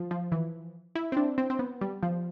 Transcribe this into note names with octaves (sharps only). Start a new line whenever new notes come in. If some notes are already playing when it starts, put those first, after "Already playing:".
Already playing: F3
F3
E3
E4
C4
D4
C4
C4
B3
G3
F3